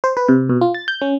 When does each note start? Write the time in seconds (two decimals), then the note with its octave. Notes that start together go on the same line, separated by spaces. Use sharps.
0.04 C5
0.17 B4
0.29 C3
0.49 B2
0.61 F4
0.74 A6
0.88 G6
1.01 C#4